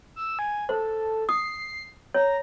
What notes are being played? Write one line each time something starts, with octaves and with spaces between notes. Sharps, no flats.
E6
G#5
A4 C5
D#6 C7
C#5 A#5